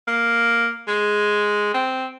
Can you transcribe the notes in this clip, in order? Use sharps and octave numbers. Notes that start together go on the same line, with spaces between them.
A#3
G#3
C4